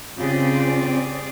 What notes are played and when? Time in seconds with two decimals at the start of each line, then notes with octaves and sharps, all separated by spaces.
0.18 C#3 C4 F4 G4 G#4 D5